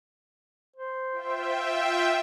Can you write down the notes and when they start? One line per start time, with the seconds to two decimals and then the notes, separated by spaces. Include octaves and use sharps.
0.76 C5
1.12 F4 E5 G5